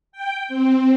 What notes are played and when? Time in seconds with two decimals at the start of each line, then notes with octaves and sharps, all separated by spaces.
0.12 G5
0.49 C4